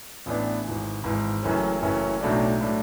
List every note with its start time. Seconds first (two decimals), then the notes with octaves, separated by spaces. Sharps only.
0.26 A1 A2 E3 B3 D4
0.64 G#1 G#2 E3
1.04 G#1 G#2 E3
1.43 F#1 F#2 E3 A3 C#4
1.82 F#1 F#2 E3 A3 C#4
2.21 B1 A2 F#3 A3 D4
2.61 A2 F#3 A3 D4